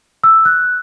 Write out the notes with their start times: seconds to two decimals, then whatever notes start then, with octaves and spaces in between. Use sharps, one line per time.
0.24 E6
0.45 F#6